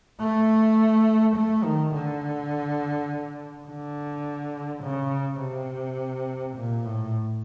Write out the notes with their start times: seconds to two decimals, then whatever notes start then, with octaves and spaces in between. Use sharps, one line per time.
0.21 A3
1.36 A3
1.64 D#3
1.94 D3
3.67 D3
4.83 C#3
5.41 C3
6.56 A#2
6.85 A2